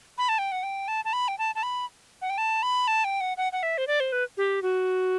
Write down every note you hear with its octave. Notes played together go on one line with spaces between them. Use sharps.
B5
A5
G5
F#5
G5
A5
A5
B5
G5
A5
A5
B5
F#5
G5
A5
B5
A5
G5
F#5
F#5
F#5
E5
C5
D5
C5
B4
G4
F#4